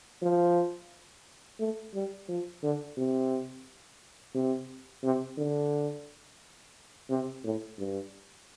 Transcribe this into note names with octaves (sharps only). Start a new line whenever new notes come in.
F3
A3
G3
F3
D3
C3
C3
C3
D3
C3
A2
G2